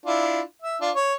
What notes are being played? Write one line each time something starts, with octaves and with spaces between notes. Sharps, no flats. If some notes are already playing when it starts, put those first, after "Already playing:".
D4 E4 F4
E5
D4 F4
C#5